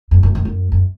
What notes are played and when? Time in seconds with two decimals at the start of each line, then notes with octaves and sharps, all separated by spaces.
0.11 F#2
0.23 F#2
0.35 F#2
0.45 F#2
0.72 F#2